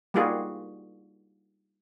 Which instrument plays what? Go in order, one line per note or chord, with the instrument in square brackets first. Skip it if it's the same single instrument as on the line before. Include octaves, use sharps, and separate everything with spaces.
[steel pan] G3 A#3 D#4 F4 F#4 G#4